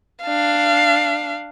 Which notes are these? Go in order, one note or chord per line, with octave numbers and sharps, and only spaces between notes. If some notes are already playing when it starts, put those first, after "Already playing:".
D4 F5